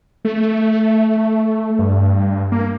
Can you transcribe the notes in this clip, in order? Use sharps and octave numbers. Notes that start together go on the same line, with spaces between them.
A3
A3
G2
A#3